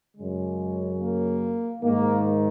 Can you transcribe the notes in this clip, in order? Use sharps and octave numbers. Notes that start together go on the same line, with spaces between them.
F#2 C#3 G#3
A#3
G#2 D#3 A#3